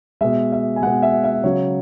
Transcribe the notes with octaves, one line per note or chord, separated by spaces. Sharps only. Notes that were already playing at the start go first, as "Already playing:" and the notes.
B2 G#3 E5
E5
G#5
B2 G#3 F#5
E5
E5
C#3 F#3 C#5